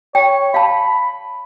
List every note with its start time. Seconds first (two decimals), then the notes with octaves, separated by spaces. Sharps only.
0.15 C#5 G5
0.54 F5 A5 B5